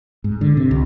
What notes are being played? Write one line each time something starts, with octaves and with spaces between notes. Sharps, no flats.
G#2
D3
C3
C#2